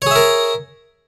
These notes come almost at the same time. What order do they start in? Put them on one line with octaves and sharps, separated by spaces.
C#5 G#4 E5 A#4